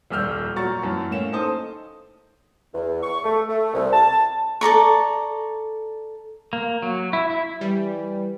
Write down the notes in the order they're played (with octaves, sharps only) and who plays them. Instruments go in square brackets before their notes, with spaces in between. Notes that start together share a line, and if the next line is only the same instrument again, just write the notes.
[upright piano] D#1 A#1 E6 F6 G6
A#2 F#3 F#4 A#5 C#6 A6
F#2 E3 C#4 A5
A2 A#3 C#4 E7
D#4 A4 C5 A5 D#6
[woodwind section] E2
C#6
A3
A3
C2
A5
[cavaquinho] A4 D5 A#5 C#6
[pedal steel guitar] A#3
F#3
E4
E4
[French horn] E3 [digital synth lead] G3